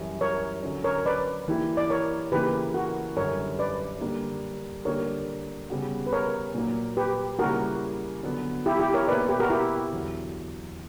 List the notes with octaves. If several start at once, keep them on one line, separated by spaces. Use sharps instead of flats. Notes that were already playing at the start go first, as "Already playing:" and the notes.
Already playing: F#2 E3 G3
A#4 C#5
D3 F#3 C#4
A#4 C#5
B4 D5
E3 A#3 E4 G4
D5
A#4 C#5
C#3 E3 A#3 G4 B4
F#4 A#4
F#2 D3 G3 A#4 C#5
B4 D5
D3 G3 A#3 D4
D3 G3 A#3 D4 G4 A#4 C#5
C#3 G3 B3 F#4
B4
A#4 C#5
A#2 F#3 A#3
G4 B4
C#3 G3 A#3 E4 F#4 G4 A#4
D3 F#3 B3
E4 G4
E4 G4
A#4 C#5
B2 A#3 E4 B4 D5
G4 B4
F#4 A#4
E4 G4
E2 D3 F#3